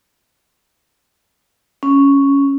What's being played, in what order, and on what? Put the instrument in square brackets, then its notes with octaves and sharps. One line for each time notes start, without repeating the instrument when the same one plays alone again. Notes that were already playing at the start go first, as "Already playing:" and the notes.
[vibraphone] C#4